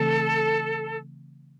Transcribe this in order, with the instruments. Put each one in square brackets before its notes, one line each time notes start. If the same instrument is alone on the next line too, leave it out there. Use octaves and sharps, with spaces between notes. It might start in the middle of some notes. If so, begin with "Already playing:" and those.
Already playing: [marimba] C#3 E3 A3 C4 [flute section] A4